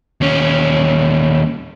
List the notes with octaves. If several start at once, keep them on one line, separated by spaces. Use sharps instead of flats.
D#2 C#4